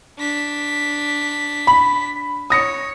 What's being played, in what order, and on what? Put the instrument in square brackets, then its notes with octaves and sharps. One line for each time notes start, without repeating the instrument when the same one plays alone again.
[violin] D4 B6
[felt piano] B5
[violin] C#5 [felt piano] D#6 A#6 C#7